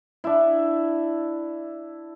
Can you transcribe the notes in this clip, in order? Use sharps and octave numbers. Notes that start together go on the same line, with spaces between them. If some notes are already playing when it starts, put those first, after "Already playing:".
D4 E4